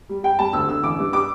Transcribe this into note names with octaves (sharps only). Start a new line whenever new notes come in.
G3
G3 G5
G3 A5
D2 E6
D3 E6
A1 D6
G2
G3 D6